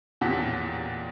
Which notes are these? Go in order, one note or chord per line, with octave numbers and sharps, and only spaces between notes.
A1 E2 A#2 G4 F#5 B6